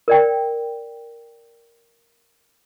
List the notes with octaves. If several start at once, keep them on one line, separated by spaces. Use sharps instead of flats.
A#4 D5 G5